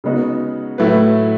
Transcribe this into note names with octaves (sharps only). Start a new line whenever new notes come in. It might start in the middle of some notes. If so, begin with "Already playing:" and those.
C#3 G#3 B3 D#4 F#4
A2 F#3 A3 E4 B4